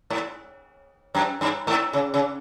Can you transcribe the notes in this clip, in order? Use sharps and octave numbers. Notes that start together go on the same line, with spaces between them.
G#2
F#2
G2
G#2
C#3
C#3